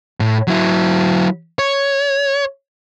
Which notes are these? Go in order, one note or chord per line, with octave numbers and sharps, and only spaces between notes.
A2
F#3 E4
C#5